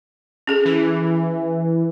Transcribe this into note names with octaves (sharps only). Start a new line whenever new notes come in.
C#4 G#4 A4
E3